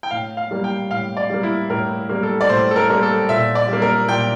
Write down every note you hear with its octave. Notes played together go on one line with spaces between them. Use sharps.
G5
A2 F5
F5
G3 A#3
G5
A2 F5
D5
G3 A#3
E4
A2 A#4
G3 A#3
A4
D5
A2 C5
A4
A#4
G3 A#3
A4
A#2 E5
D5
G3 A#3
A#4
A#2 G5